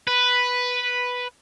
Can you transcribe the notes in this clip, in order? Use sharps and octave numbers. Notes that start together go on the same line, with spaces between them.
B4